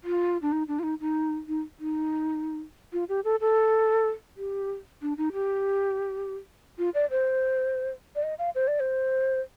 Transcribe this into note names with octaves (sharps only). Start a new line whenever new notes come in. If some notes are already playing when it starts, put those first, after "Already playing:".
F4
D4
D#4
D4
F4
D#4
D#4
D#4
D#4
F4
G4
A4
A4
G4
D4
D#4
G4
F4
D5
C5
D5
D#5
F5
C5
D5
C5